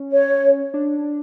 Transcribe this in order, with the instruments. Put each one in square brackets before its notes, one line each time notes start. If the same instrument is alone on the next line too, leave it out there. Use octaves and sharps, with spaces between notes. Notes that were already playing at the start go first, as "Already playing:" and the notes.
Already playing: [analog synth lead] C#4
[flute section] C#5
[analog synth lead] D4